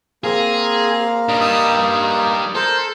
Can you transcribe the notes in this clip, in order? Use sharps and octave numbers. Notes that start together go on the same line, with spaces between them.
A#3 C4 G#4 F5 A#5
G3 D4 D#5 A#5
D#4 D#6 E6
D#4
A4 A#4 C5